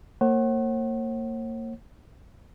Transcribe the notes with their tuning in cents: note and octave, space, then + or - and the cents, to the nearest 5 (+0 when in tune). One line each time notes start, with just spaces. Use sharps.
A#3 -30 C#5 -45 F#5 +25